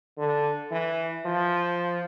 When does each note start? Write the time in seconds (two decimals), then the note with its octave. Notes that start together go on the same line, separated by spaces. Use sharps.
0.18 D3
0.72 E3
1.25 F3